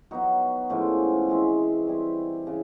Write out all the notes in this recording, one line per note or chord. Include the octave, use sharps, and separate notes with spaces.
F#3 B3 D#4 F#4
A2 F3 G#3 C#4
E3 G#3 C4
G3 C4 E4
C#3 E3